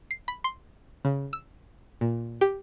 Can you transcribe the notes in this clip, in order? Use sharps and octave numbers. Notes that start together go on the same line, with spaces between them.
C7
B5
C6
C#3
E6
A#2
G4